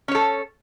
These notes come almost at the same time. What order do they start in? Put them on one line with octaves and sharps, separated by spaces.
C#4 C#5 A4